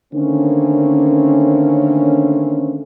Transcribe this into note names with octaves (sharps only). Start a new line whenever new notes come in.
D3 D#3 A3 A#3 C4 C#4